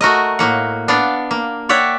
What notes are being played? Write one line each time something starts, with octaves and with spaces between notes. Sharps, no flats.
A3 F#4 A#4 D#5
A2 A#3 F#5
B3 D4 D5 F5 F#5
A#3
C#5 D5 E5 F#5 G5